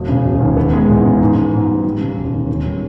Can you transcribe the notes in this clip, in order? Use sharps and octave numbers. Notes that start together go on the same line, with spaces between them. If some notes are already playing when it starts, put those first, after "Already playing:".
Already playing: E1
C#3
E1
D#2
B3
G#3
E2
C#3
G#2
B3
G#2
G3
G3
C#3
E1
D#2
C#4
G3